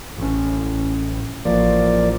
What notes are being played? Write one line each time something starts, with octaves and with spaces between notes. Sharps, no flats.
A1 C#4
A1 F3 A#3 D5